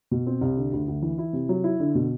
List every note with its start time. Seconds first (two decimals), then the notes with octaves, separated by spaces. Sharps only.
0.11 B2
0.27 C4
0.41 C2
0.57 D3
0.72 D2
0.88 D2
1.02 E3
1.18 E4
1.33 C3
1.49 F#3
1.64 E4
1.80 D3
1.95 B2